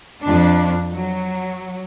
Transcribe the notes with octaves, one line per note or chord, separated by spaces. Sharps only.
F2 D4
F#3